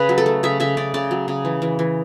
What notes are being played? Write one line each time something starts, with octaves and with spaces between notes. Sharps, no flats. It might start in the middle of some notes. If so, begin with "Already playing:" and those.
Already playing: C#3 B4
F#3
A4
A3
C#3 E5
C#3 E5
C#3 D5
C#3 D5
F#3
C#3
E3
E3
E3